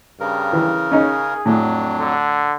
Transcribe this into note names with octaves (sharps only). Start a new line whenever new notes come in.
G2 C#3 A#4
E3
C#4 D#4 G#4
F2 A2 F#3 D4
D3